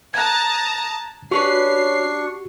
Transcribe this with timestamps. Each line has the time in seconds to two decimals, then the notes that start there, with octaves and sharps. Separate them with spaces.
0.14 A5 A#5 D#6 F#6 G#6
1.31 C#4 D4 F#4 G4 B4 C#5 C#6 C7